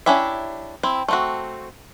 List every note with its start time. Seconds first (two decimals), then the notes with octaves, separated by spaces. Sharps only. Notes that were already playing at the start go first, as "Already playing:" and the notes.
0.06 C#4 D4 E4 G4 E5
0.83 C4 E4
1.08 A3 C4 F#4